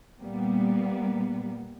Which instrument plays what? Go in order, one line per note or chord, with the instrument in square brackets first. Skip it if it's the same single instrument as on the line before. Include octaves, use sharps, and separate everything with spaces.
[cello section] A#2 G3 A#3 B3